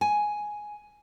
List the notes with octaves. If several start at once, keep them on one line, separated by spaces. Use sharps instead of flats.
G#5